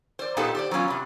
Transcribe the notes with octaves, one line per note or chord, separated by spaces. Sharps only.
C5 D5
A#2 B3 D#4 G4 A4 A5
G4 C5 D5
F#3 B3 C#4 F4
C3 G3